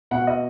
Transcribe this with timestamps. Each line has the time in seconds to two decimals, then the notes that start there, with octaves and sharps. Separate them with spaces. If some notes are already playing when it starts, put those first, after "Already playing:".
0.11 B2 F#5
0.27 D#5